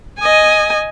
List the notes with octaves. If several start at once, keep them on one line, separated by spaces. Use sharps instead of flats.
D#5 G#5